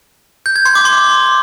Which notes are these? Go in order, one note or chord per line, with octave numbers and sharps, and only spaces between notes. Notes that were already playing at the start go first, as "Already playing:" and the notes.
G6
G#6
C6
D6
C6